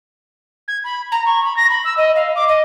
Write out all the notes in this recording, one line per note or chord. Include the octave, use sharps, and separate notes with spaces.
G#6
B5
A#5
C#6
B5
A#6
B5
E6
D#5
F5
D6
D#5